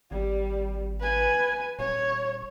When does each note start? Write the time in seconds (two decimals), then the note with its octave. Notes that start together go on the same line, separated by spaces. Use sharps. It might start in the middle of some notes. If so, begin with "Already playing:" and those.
0.11 G#1 G3
1.00 B4 G#5
1.79 D#1 C#5